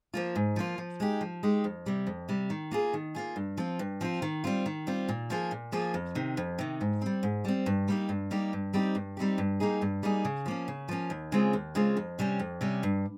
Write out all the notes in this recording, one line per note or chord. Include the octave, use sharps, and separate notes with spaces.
F3 A#3 F4
G#2
F3 A#3 F4
F3
G#3 D#4 G4
F3
G#3 D#4 G4
F2
C3 G3
F2
C3 G3
D#3
A#3 F4 G#4
D#3
A#3 F4 G#4
G2
F3 C4 F4
G2
F3 C4 F4
D#3
G3 C4 F4
D#3
G3 C4 F4
A#2
F3 A#3 F4 G#4
A#2
F3 A#3 F4 G#4
F2
C3 D#3
F2
C3 D#3
G#2
G3 C4
G#2
G3 C4
G2
G3 A#3 D#4 G4
G2
G3 A#3 D#4 G4
G2
G3 C4 D#4 G4
G2
G3 C4 D#4 G4
G2
G3 A#3 D#4 G#4
G2
G3 A#3 D#4 G#4
C#3
F3 A#3 C#4
C#3
F3 A#3 C#4
D#2
C#3 G#3 C4 F4
D#2
C#3 G#3 C4 F4
F2
C3 G3 C#4
F2
C3 G3 C#4
G2